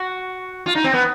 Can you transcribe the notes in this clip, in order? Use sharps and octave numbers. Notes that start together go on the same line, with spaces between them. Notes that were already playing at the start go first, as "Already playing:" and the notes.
Already playing: F#4
F4
D#4
C4
B3